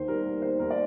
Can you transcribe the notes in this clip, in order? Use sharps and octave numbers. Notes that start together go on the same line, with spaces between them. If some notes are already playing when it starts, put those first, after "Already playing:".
Already playing: D#2 D#3 C5
G3 A#4
A#3
D#3 C5
D#2 A#4
D5